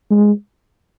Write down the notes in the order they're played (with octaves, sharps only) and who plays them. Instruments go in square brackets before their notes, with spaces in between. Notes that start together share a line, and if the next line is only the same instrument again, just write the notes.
[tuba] G#3